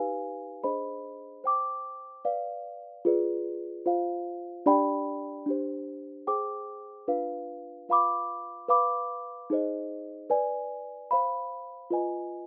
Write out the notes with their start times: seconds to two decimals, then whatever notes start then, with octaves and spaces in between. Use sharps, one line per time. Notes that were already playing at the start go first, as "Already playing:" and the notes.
Already playing: D#4 G4 B4 F5 G#5
0.63 D4 G#4 C5 D#5 B5
1.44 C5 G5 D6
2.25 B4 D5 F5
3.05 F4 G#4 B4 D5
3.86 F4 C5 F5
4.66 D4 G4 D5 G5 B5
5.46 D4 G4 C5
6.27 G#4 C5 G5 D6
7.08 D4 F4 B4 F5
7.89 F4 B4 F5 B5 D6
8.68 B4 F5 B5 D6
9.50 D#4 G#4 C5 D#5
10.30 B4 D5 G#5
11.11 C5 F5 B5
11.90 F4 B4 D#5 G#5